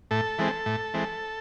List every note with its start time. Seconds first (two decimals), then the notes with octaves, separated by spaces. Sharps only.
0.11 A2 A4
0.38 E3 G#3 C4
0.66 A2
0.94 E3 G#3 C4